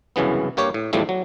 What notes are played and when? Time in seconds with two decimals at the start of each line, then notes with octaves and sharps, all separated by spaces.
0.16 C2 F#2 C#3 E3 B3
0.57 G2 A#3 G4 C#5
0.74 A2
0.93 E2 A2 F3 G3 A3
1.09 F#3